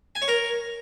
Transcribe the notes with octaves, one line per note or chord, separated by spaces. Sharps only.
G#5
C#5
A#4